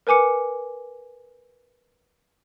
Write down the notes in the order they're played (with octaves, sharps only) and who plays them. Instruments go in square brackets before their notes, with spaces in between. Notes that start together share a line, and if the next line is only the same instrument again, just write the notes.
[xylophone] A#4 B4 G#5 D6 C#7